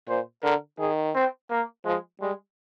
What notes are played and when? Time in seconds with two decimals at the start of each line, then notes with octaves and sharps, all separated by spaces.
0.08 A#2 C5
0.43 D3 A#4
0.79 D#3 G#4
1.14 C4
1.50 A#3
1.85 F3 G#3
2.21 G3 G#3